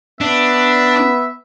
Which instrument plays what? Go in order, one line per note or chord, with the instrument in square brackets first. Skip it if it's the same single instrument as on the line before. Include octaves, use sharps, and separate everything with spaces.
[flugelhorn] B3 [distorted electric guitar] D4 [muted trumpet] E5